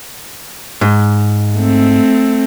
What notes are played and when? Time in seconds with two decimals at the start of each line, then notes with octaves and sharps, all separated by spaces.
0.81 G#2
1.58 A3 C4